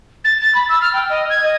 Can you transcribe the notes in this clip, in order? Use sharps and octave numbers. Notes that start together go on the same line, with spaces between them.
A6
A6
B5
E6
F6
G5
D#5
G#6
D#5